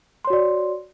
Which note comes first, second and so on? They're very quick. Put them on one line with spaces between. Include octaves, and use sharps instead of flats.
C6 C#5 F#4 D5